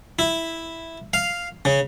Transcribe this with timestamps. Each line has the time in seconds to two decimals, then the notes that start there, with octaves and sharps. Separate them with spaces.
0.19 E4
1.13 F5
1.65 C#3